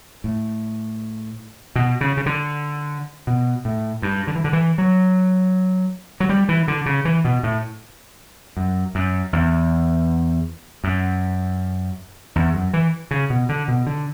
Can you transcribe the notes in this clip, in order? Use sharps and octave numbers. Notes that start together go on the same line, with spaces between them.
A2
B2
C#3
C#3
D3
B2
A2
G2
D3
E3
D3
E3
F#3
F#3
G3
E3
D3
C#3
E3
B2
A2
F#2
F#2
E2
F#2
E2
F#2
E3
C#3
B2
D3
B2
D3